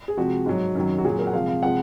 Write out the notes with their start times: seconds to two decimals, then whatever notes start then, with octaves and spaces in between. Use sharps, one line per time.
0.08 G#4
0.17 C3 F3 G#3 F#4
0.46 G#2 F#3
0.75 F#2 D#3 F#3
0.98 F#4
1.05 A#2 F#3 G#4
1.19 A#4
1.27 F#5
1.33 C3 F3 G#3 F5
1.48 F5
1.63 C3 F3 G#3 F#5